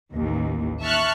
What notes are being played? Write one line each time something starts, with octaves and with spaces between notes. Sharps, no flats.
A1 D#2
E5 A5 C#6 F6 F#6